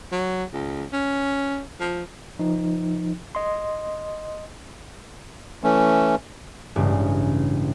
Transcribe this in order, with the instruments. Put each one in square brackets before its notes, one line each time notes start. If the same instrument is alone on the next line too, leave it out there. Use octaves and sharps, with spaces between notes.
[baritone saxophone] F#3
C#2
C#4
F3
[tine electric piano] F3 D#4
D#5 C6
[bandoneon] E3 A3 C#4
[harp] A1 G2 C#3 G#3